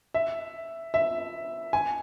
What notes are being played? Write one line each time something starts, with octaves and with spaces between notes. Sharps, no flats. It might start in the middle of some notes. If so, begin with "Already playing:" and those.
E5
E5
G#5